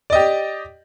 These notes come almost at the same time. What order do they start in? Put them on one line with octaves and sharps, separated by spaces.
D5 D#5 G4